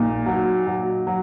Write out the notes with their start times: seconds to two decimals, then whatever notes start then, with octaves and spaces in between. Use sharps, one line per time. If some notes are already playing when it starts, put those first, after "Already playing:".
Already playing: A#1 A#2 D#4
0.26 F#3
0.67 F#3
1.07 F#3